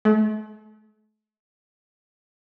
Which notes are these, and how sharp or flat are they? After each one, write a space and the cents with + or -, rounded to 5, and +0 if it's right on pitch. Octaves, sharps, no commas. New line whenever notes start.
A3 -40